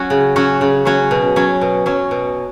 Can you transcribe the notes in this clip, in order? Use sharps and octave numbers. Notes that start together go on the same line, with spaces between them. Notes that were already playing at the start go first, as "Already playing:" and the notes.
Already playing: F#3 C#4 F#4
C#3
F#3 C#4 F#4
C#3
F#3 C#4 F#4
B2
F#3 C#4
B2
F#3 C#4
B2